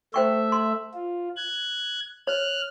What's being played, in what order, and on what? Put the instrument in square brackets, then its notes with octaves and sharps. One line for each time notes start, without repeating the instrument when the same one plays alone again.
[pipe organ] A3 E5 [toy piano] C5 G5 C#6
[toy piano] C6
[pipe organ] F4
F#6 G#6
[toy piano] C#5 [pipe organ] F6 F#6